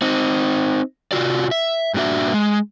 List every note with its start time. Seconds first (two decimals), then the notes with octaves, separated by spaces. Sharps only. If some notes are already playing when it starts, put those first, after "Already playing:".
0.02 C4 D#4
1.12 C3 F4 F#4 D5
1.51 E5
1.94 G2 A#2 D4 F#4 E5
2.34 G#3